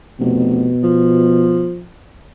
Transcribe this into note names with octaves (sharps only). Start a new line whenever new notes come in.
F1 B2
F3